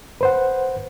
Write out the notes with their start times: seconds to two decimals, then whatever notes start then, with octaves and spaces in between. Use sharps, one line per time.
0.21 B4 C5 F#5